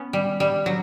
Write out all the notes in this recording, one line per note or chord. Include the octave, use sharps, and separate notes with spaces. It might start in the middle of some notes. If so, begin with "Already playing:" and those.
Already playing: B3 C#4
G3
G3
F#3